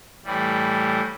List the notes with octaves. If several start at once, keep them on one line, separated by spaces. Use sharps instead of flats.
A2 E3 G3